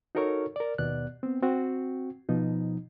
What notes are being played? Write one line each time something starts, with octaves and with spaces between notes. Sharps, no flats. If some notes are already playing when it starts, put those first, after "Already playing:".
D#4 F#4 A4 A#4 C#5 C#6
A#4 D5
D#2 B2 B3 D5 F#6
B3 C4
C4 F#4
B2 F3 D#4